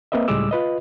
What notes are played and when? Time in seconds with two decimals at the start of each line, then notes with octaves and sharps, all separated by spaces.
0.12 A#3 C4 B4 D#5 E5
0.28 C#2 A2 G3 G#3 D6 E6
0.51 F4 B4 D#5